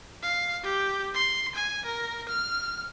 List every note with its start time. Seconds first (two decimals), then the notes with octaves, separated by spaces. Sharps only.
0.22 F5
0.63 G4
1.14 C6
1.55 G#5
1.85 A#4
2.29 F6